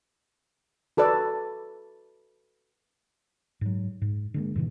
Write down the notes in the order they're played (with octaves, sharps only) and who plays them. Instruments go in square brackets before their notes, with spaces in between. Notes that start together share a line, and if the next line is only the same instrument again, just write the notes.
[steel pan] F#4 A4 B4 D5
[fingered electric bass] G#2 F#3
G#2
D3 G#3 A#3
G2 A#2 D3 E3